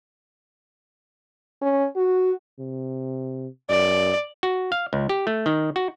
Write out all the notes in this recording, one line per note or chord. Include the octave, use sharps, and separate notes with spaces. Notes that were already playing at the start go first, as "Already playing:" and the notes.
C#4
F#4
C3
F#2 D5
F#4
F5
C#2
G4
A3
D#3
F#4